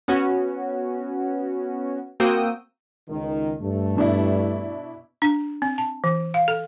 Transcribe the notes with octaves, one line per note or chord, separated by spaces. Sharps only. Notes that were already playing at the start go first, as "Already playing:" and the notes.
B3 C#4 F#4
A#3 C4 F#4 G5 D#6 E6
C#2 D#3
G2 A3
B2 D4 E4
D4
C4
A5
E3
F5
A4